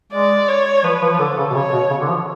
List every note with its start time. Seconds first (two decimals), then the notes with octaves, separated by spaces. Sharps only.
0.12 G#3 D5
0.48 C#5
0.84 F3 B4
1.02 F3
1.13 F3
1.19 D3 A4
1.37 C#3
1.50 B2
1.55 C#3 C#5
1.73 B2
1.90 C#3
2.01 D3
2.09 F3